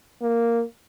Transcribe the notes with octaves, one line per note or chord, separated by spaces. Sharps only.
A#3